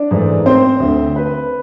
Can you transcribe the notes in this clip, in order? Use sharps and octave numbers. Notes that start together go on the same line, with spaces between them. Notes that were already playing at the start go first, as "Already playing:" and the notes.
Already playing: D4 D5
G#2 E3 A3
C4 C5
D2 D3 A3
B4